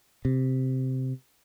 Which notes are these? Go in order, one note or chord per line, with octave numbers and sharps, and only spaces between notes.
C3